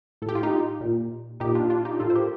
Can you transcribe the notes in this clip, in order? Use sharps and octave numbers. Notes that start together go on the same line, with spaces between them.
A2 A4
G4
F4
D#4 G4
A#2
A#2 D#4 G4
D4 F4
D4 F4
D#4 G4
A2 F4 A4
C5
G4 A#4